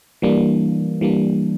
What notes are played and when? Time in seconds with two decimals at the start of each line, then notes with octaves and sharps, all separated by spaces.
0.22 E3 G3 A#3 D4
1.01 E3 G3 A#3 D4